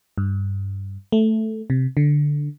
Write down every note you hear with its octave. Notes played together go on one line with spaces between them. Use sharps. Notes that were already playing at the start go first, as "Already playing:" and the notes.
G2
A3
C3
D3